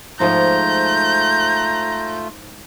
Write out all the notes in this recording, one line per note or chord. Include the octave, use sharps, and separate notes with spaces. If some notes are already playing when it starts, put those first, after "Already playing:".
G#2 F3 A3 F4 A#5 G6